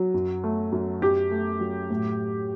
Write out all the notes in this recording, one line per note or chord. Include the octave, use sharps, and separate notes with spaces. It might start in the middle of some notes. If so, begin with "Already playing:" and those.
Already playing: F#3
F#2
A3
F#2
F#2 G4
A3
F#3
A2